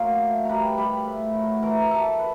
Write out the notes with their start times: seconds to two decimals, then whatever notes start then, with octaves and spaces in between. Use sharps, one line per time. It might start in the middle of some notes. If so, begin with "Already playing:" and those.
Already playing: A2 F#3 A#3 F4 F5
0.21 A3
0.45 G3 B4 A#5 B5
0.77 G3 B4 B5
1.06 A2
1.35 F#3
1.62 E3 A#4 A#5
1.81 A#5
1.91 E3 A4 A5
2.19 B4